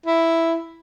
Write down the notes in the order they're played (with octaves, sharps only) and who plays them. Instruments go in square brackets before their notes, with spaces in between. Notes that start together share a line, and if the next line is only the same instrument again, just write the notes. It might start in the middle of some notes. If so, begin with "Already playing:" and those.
[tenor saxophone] E4